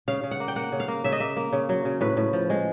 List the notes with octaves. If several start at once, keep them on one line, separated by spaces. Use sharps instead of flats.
C#3 F5
C#3
F#5
A#3
G5
A#3 F#5
C#3
F5
A#3
C#3 E5
D#5
A#3 E5
A#3
C#3
F#3
C#3
A2 B4
A2
F3
G#3